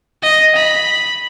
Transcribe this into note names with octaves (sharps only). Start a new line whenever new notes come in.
D#5
B5